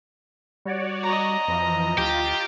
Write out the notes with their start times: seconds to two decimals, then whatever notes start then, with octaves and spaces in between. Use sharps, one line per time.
0.65 G3 F#4 C#5 D5
1.04 D#5 A#5
1.48 F2 E3 F3
1.98 D2 F4 G4